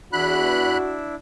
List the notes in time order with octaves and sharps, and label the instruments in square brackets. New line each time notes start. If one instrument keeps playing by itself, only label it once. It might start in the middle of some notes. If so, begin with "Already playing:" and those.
[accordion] E2 B5 F#6 [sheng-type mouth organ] D4 E4 [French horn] F#4